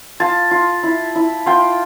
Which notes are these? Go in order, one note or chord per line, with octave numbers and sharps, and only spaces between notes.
F4 A5
F4
E4
E4
F4 G5